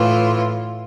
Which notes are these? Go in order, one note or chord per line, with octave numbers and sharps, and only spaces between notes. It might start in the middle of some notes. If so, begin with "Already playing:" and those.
Already playing: A2 E3 F4